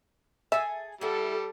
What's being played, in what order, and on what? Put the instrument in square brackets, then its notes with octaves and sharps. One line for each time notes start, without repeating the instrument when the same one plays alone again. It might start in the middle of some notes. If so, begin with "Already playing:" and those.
[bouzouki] G#4 A4 G#5 [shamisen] E5
[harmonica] G3 [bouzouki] E4 F#5 [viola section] A4